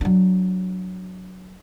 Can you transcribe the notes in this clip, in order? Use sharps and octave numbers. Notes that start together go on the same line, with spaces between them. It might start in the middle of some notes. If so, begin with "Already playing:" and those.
F#3 D4